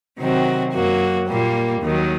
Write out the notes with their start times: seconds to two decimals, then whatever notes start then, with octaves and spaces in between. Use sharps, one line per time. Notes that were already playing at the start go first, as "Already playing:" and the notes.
0.18 C3 D#3 F#3 C4 F#4
0.73 F#2 F#3 A#3 F#4
1.28 A#2 G3 A#3
1.82 D#2 D#3 F#3